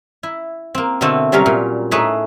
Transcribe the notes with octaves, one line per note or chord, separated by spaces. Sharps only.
E4
A#3 C4
B2 D3 A3 C4 A4
C3 F#3 G3 C4 C#4 A#4
A#2
A2 A3 D#4 G#4 B4